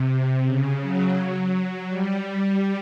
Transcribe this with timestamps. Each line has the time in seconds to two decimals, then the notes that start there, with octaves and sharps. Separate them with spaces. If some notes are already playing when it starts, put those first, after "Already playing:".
Already playing: C3
0.46 C#3
0.81 F#3
1.88 G3